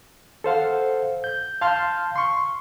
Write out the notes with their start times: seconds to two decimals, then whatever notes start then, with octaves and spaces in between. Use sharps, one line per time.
0.44 A4 C5 F5 F#5
1.24 G6
1.61 F5 A5 C6 F6 G6
2.16 C6 C#6